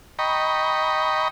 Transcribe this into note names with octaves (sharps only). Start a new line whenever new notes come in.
D#5 G5 A#5 B5 C#6